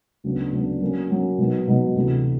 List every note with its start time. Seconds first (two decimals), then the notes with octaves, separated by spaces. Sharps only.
0.24 D2 C#3 F#3 B3 D4
0.52 D2 C#3 F#3 B3 D4
0.81 F#3 A#3 C#4
1.10 F#3 A#3 C#4
1.38 B2 F#3 B3 D#4
1.67 B2 F#3 B3 D#4
1.95 D2 C3 E3